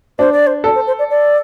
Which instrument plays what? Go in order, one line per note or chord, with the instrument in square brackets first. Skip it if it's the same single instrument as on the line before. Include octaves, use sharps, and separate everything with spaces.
[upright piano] D4 [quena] C5
[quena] D5
C5
[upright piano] A4 [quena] D5
[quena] C5
C5
D5
D5